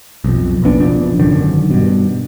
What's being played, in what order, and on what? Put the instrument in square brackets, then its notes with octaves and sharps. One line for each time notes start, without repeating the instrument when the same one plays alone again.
[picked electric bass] B1 F2
A#1 A#2 B3 D4
F#1 B2 F3 D4
G#1 F#2 D3 D#3
G2 B2